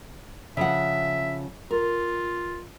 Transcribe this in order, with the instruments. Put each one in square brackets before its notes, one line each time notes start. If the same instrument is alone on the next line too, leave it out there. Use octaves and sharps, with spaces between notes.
[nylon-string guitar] C#3 F3 F#5 [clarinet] E5
[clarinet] F4 [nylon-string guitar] A#4